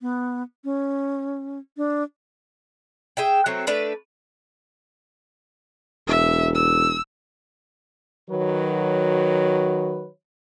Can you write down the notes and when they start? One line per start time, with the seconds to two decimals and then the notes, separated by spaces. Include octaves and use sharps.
0.01 B3
0.64 C#4
1.77 D4
3.17 G#4 E5 G5
3.46 F#3 A3 C4
3.67 A3 D4 B4 D5
6.07 E1 E5
6.54 E6
8.29 D#3 F#3 F#4 B4 C#5